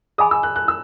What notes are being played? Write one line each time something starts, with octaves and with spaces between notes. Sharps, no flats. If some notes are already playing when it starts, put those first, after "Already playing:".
G#4 D#5 G#5 B5 D#6
E6
F#6
F#6
E6